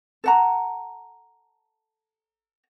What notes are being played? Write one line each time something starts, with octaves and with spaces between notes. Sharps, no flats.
A4 F#5 A#5